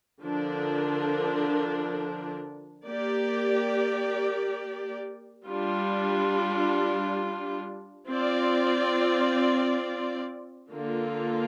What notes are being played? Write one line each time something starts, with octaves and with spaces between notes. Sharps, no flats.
D3 F3 D4 A#4
A#3 G4 D5
G3 D4 F4
C4 F4 D5
D3 A#3 F4